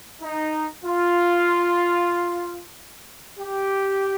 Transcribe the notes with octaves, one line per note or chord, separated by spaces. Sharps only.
D#4
F4
G4